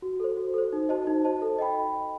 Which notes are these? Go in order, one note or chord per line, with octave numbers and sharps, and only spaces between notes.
F#4
A4 C5
F#4
A4 C5
D#4
F#4 C5 D#5 A5
D#4
F#4 C5 D#5 A5
A4
D#5 G5 B5